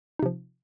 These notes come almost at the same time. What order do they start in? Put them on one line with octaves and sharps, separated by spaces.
D#4 C3 F3